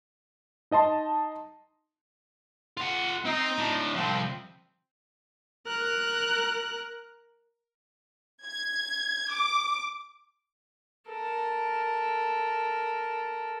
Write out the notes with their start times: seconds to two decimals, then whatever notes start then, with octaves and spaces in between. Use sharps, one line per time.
0.71 D#4 D#5 A5 C6
2.77 F4 F#5
3.25 C4 D#4
3.58 A2 D3
3.96 C2 F3 C4
5.67 A#4 F#6
8.44 G#6
9.31 D6
11.10 A4 A#4